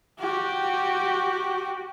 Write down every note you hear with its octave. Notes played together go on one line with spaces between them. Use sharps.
F#4 G4